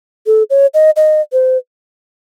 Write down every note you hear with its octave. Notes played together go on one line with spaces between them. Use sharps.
A4
C#5
D#5
D#5
C5